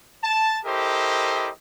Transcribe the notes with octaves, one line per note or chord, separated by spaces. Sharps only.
A5
E4 G4 A4 A#4 C5 D#5